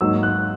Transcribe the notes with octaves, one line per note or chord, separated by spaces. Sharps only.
G#2 F#3 A#3 D#4 E6
F#6